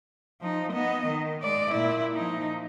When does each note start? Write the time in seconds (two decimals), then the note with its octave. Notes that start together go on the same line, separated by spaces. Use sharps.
0.41 F3 D#4
0.73 B3 D#5
1.07 D#3
1.42 G#3 D5
1.71 A#2 E4
2.14 F3 D#4